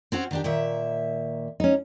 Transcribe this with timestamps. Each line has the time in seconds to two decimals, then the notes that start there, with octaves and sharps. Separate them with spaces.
0.12 C4 C#4 F#4
0.31 D#3 D4 G4
0.44 A#2 D#3 E5
1.60 C#4 D#4